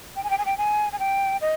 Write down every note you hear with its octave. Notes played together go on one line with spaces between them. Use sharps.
G5
G#5
G5
G#5
G5
G#5
G#5
G5
D#5